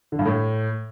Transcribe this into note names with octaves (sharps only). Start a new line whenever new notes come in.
D3
G2
A2